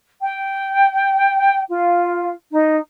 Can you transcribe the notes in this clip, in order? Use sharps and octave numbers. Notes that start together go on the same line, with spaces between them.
G5
F4
D#4